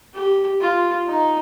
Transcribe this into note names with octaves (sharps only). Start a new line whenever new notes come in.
G4
F4
D#4